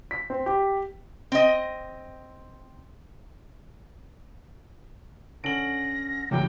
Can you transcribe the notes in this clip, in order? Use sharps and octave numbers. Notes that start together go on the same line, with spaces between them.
B6
C4
G4
C4 D#5
D3 C#4 A#6 D7 F#7
E2 G2 C#3 E3 F#3 E4 C#5 G5